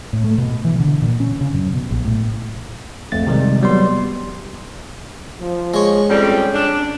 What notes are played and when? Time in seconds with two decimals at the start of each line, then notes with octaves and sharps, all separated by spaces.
0.13 A2
0.24 A3
0.38 B2
0.65 E3
0.80 D3
1.02 A#2
1.20 C#4
1.41 C#3
1.54 F#2
1.74 B2
1.91 A#1
2.05 A2
3.12 A#1 F2 A3 A6
3.27 C3 D#3 G3 G#3
3.62 F#3 G3 B3 C6
5.41 F3
5.74 G#3 C#5
6.09 F2 G3 C#4
6.54 D4